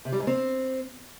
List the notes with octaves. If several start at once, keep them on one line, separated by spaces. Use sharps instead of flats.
C3
G3
G#2
C4